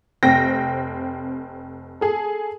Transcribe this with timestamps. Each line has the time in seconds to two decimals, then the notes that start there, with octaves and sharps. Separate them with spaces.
0.23 F1 C4 G5 A#6
2.01 G#4 A4